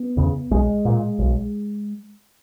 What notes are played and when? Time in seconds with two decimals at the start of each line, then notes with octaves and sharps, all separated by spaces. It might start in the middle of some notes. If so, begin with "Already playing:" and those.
Already playing: B3
0.17 E2 C#3
0.51 B1 G#3
0.85 A#2
1.19 B1